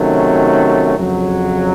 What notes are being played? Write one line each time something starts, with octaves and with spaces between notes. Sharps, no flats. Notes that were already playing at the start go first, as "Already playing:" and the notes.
Already playing: C3 D#3 F#3 A3 C#4
F2 C#3 F#3